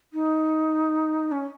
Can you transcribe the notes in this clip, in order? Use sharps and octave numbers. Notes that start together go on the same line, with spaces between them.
D#4
C#4